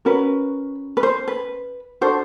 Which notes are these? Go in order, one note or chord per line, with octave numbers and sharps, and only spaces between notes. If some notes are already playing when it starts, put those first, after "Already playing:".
C#4 F#4 A#4 B4
B4
C5
B4
D4 F#4 A4 C5